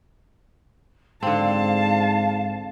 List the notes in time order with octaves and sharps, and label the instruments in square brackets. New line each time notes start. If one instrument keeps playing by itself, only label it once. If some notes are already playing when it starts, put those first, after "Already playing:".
[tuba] G#2 [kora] D3 C4 [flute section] F5 [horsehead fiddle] A5